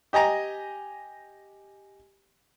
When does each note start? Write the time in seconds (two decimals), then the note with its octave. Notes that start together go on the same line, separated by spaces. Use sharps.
0.13 G4 D#5 G#5 A#5